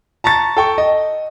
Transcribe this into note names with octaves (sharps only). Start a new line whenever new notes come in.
A5 A#5 C#6 A6
A4 G5 C#6
D#5